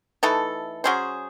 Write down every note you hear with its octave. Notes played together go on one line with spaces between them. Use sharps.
E3 A3 D#4 A4
F#3 C#4 G#4 C5